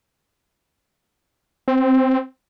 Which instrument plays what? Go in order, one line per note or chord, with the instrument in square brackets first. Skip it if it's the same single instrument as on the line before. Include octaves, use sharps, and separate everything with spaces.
[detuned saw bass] C4